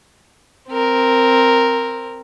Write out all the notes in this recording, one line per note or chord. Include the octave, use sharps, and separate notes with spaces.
C4 A#4